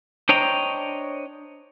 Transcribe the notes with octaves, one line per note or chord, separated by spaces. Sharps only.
D4 C5 C#5 D#5 G5 A#5